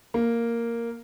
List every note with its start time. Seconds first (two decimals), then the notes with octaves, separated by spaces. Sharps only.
0.14 A#3